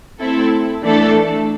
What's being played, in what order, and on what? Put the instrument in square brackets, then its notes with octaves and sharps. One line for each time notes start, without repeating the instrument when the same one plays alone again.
[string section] A3 C4 E4 A4
E3 A3 D4 A4